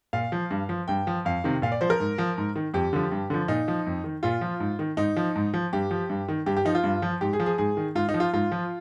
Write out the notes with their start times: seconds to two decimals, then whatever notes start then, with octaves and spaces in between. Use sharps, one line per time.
0.13 A#2 F5
0.32 F3
0.51 G2
0.69 F3
0.88 G2 G5
1.07 F3
1.25 F2 F5
1.44 C3 D#3
1.62 A#2 F5
1.72 D5
1.81 F3 C5
1.90 A#4
2.00 G#2
2.18 F3
2.38 G#2
2.56 D#3
2.74 F2 G4
2.93 D3 F3
3.12 G2
3.30 D3 F3
3.48 A#2 D#4
3.68 F3
3.87 F2
4.04 D#3
4.23 A#2 F4
4.41 F3
4.60 G#2
4.79 D#3
4.97 G#2 D#4
5.16 F3
5.36 G#2
5.54 F3
5.73 G2 G4
5.91 F3
6.10 G2
6.29 D#3
6.46 G2 G4
6.57 G4
6.65 F3 D#4
6.75 F4
6.84 G2
7.02 F3
7.21 G#2 G4
7.33 G#4
7.40 F3
7.46 G#4
7.58 G#2 G#4
7.77 D#3
7.95 G#2 F4
8.09 D#4
8.14 F3
8.20 F4
8.33 G#2 F4
8.52 F3